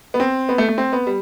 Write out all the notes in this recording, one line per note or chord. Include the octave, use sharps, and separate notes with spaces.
B3
C4
B3
A3
A3
C4
B3
G3